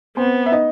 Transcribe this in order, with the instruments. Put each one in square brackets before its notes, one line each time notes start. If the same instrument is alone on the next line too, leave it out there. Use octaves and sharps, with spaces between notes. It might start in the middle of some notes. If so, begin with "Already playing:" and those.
[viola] B3 [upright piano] C4 C5
[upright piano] E5
D#4 D#5